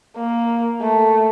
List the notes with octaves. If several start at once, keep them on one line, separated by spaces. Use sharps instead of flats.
A#3
A3